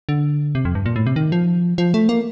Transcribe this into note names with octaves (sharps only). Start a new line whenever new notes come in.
D3
C3
F2
G2
A#2
A2
C3
D#3
F3
F3
A3
A#3